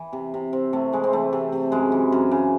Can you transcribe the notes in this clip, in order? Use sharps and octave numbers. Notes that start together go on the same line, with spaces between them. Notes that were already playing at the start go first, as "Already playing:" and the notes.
Already playing: E3
C3
C3
C3 C4
C3 A3
E3 G#3
C4
E3 A3
C3
C3
F#2 G#3
E3
F#2
C#3